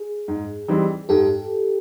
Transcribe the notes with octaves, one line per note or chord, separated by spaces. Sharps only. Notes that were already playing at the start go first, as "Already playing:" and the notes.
Already playing: G#4
G#2
E3 G3 C4 D#4
G#2 G4 A4